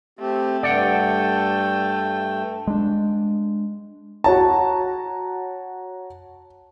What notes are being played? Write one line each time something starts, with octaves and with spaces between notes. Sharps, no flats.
A3 C4 G4
G2 D5 F#5 G5
G#3 D4
F#4 C#5 A5 A#5